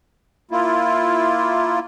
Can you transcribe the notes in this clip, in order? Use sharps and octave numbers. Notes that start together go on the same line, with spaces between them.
A#3 E4 F4